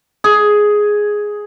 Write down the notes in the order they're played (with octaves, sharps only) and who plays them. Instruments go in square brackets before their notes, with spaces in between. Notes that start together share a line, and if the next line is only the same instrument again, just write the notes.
[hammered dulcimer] G#4